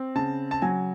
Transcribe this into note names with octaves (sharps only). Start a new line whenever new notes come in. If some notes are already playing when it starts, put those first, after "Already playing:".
Already playing: C4
C#3 A5
A5
F#3 G#5